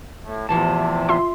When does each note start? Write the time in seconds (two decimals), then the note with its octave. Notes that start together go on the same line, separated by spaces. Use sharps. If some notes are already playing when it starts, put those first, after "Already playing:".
0.22 A2
0.49 E2 A2 C3 E3 F3 A5
1.09 F4 E5 C6